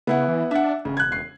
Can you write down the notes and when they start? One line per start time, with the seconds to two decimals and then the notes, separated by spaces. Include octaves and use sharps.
0.07 C#3 B3 E4 F#5
0.28 E3
0.51 D4 E5 F#5
0.85 E1 C#3
0.97 F#6 G#6
1.12 C7